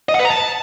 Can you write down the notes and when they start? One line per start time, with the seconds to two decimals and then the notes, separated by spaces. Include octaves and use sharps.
0.09 D#5
0.14 F#5
0.20 B4
0.25 A#5
0.30 A5